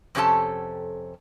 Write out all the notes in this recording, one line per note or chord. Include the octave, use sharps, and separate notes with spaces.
F2 C3 C#4 G4 A4 A5